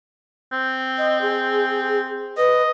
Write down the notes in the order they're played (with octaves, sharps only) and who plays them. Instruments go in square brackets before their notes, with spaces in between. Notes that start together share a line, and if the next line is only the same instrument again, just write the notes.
[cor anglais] C4
[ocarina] D#5
G#4
[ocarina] B4 [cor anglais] D#5